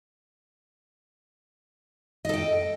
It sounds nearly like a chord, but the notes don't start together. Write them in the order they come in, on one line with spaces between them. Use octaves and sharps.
D#5 A4 G5